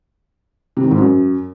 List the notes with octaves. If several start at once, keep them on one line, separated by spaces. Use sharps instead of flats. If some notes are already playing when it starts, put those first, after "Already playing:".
C3
D#3
G#2
F#2